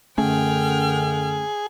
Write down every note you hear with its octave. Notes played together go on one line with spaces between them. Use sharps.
F#2 D3 A3 C#4 G#4 G5 F6